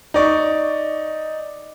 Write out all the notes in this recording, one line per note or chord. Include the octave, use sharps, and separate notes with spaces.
D#4 D5 C#6